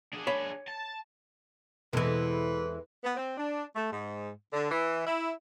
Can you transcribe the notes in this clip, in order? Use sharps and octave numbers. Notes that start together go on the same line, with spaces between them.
D4 G#4
C#5 B5
A5
E2 B2 E3 G#3 C4 A4 B4
B3
C4
D4
A3
G#2
D3
E3
E4